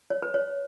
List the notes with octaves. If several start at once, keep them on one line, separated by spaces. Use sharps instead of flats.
C#5
B4
C#5